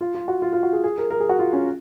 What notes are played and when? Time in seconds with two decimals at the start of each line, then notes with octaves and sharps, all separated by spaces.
0.01 F4
0.15 F4
0.28 F#4
0.42 F4
0.53 F4
0.63 F#4
0.73 G#4
0.84 G#4
0.98 A#4
1.11 A#4
1.20 G#4
1.29 F#4
1.39 F4
1.53 C#4